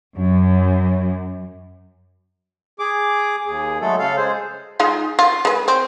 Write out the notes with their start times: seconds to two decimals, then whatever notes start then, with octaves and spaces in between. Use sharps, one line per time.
0.17 F#2
2.79 G#4 D6
3.47 D#2 G#4
3.81 F#3 G#3 A3 A4
3.99 C#3 A4 F5
4.16 G#3 G#4 C5
4.80 G#3 D#4 F4
5.19 F4
5.45 G#3 B4
5.68 C4